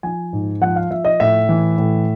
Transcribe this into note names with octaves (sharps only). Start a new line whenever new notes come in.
F3 G#5
G#2
F3 F#5
F5
F3 E5
D#5
A2 E5
E3
A2